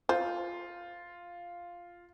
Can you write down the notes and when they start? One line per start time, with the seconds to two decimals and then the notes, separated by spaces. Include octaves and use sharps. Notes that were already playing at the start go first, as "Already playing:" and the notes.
0.09 F4 C5